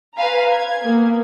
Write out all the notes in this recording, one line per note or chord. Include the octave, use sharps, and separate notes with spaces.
B4 C5 F5 G#5 A#5 B5
G#6
A#3 B3